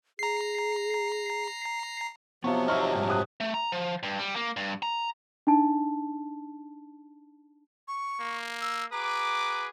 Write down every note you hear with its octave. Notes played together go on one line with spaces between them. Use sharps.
G#4 A#5 C7
C3 F3 F#3 B3 F4 C#6
D#4 G4 D#5 E5 C#6 F6
G#2 G3
G4 D#6 F#6
A3
A#5
F3
G2
G3
A#3
G2
A#5
D4 D#4 A5
C#6
A#3
E6
F#4 G#4 B4 A#5 D6